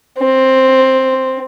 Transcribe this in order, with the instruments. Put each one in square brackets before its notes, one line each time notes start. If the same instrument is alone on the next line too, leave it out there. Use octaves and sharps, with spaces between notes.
[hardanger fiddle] C4